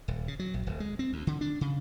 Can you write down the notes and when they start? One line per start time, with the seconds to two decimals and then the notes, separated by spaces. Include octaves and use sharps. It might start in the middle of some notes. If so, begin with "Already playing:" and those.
0.08 D#1
0.28 C#3
0.39 F#3
0.54 A#1
0.66 D1
0.80 G#3
0.99 C4
1.13 D2
1.27 D3
1.41 D4
1.61 C#3